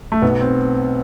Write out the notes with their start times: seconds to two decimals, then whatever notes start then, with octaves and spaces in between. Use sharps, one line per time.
0.12 A3
0.22 B1 B3
0.40 C4